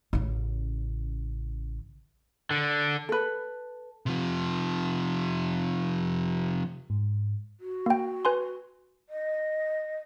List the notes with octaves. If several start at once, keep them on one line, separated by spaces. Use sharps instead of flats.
A1 C#3
D3
A4 B4
C3 F3
G#2
F#4
A#3 G5
B4 G#5 C6
D#5